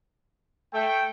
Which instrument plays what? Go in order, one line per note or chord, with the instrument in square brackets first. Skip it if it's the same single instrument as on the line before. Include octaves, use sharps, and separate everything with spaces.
[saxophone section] A3 [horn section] G5